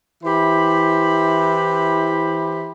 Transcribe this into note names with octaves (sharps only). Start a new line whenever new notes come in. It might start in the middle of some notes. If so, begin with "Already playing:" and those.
E3 E4 G4 C5 B5